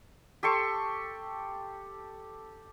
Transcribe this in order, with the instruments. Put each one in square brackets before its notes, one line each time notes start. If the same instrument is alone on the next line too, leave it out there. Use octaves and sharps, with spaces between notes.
[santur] G4 A4 C6 C#6